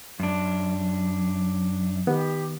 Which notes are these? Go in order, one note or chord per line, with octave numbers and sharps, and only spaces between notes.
F#2 D4
D#3 B3 G4